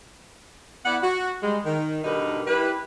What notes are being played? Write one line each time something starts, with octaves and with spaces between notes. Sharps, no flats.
B3 E4 B4 D5 F#5
F#4
G3 G#3
D#3
B2 D3 G3 D#4 A#4 B4
G3 E4 G4 B4